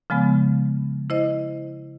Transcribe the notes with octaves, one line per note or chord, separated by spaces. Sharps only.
C#3 F3 G#3 B3
E4 C5 D#5